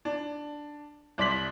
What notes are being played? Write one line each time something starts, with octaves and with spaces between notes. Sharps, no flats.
D4
C2 D5 C6 B6 F#7